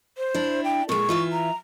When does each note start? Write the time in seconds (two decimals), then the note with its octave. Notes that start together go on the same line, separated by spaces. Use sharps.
0.18 C5
0.34 D4 E4
0.64 G5
0.89 A#2 G#3 C#6
1.09 E3 F4 E5
1.32 A#5